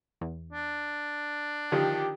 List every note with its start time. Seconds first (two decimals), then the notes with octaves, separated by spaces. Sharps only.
0.21 E2
0.53 D4
1.72 D3 D#3 F3 G4